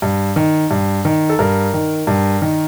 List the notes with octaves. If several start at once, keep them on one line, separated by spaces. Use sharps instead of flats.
G2
D#3
G2
D#3
A4
G2 A#4
D#3
G2
D#3